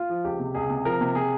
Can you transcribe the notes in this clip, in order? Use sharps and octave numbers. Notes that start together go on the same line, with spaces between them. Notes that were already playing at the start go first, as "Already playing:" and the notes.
Already playing: F4
F3
C#2 G4
C3
C#2 G#4
C3
F3 A#4
C3
C3 G#4